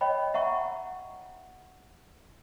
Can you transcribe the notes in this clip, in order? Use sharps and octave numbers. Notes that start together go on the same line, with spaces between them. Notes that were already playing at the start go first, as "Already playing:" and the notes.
C#5 D#5 G5 B5
E5 F#5 A#5 C#6